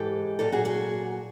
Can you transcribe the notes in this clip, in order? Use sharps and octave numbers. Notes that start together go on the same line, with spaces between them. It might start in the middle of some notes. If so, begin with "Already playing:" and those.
Already playing: G#2 E3 G#3 G4 A4
A#2 F#3 G4 A4
F#4 G#4
F#4 G#4